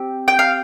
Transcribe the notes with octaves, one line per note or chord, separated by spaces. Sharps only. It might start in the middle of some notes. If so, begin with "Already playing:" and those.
Already playing: C4 G4
G5
F5